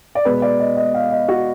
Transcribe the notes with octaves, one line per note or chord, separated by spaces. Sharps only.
D5
B2 G#3 B4
D5
D#5
D#5
F5
D#5
F#4